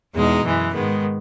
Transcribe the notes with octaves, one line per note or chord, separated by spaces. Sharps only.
E2 B2 G#3 D#4
F#2 E3 G#3
G#2 D#3 G#3 B3